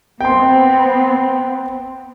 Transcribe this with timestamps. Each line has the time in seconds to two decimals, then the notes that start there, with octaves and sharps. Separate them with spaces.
0.21 B3 C4 G5 C6